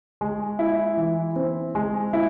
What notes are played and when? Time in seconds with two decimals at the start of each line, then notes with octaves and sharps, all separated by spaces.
0.21 G#3
0.59 E4
0.97 E3
1.36 C4
1.75 G#3
2.13 E4